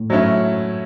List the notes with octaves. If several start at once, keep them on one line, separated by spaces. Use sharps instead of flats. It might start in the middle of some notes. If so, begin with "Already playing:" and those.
Already playing: A2
F#3 A3 C#4 E4